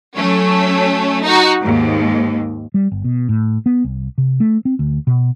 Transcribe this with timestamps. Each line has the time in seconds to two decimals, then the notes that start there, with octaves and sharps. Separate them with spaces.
0.15 F#3 A3 C#4
1.23 D#4 F#4
1.61 D#2 G#2
2.74 G3
2.92 G1
3.04 B2
3.29 A2
3.66 B3
3.84 C2
4.18 C3
4.40 A3
4.65 C4
4.79 D2
5.07 B2